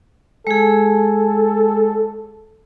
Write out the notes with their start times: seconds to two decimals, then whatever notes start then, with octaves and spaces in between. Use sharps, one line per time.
0.47 G#3 G#4 A4